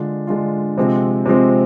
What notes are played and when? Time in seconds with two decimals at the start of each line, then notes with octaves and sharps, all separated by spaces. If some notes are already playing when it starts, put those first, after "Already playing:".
Already playing: D3 G#3 D4 F4
0.27 D3 G#3 D4 F4
0.78 C3 F3 G#3 C4
1.26 C3 F3 G#3 C4